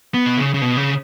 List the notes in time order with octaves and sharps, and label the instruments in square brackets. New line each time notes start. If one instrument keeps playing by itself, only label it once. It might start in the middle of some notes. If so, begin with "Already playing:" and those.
[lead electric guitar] B3
B2
C#3
C#3
B2
C#3